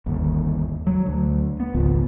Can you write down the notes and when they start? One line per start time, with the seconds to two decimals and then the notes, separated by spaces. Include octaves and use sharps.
0.06 G1 D#2
0.87 F#3
1.06 D2
1.60 B3
1.74 G#1 C#2 F3